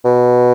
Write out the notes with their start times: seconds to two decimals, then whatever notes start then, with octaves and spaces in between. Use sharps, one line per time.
0.05 B2